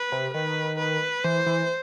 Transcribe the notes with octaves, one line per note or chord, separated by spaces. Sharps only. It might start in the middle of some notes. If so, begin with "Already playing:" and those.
Already playing: B4
C3
D#3 B4
B4
E3 C5
E3